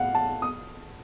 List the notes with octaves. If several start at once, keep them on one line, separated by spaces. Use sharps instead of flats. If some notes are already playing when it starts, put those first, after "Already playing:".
Already playing: A2 F5 F#5
A5
D#6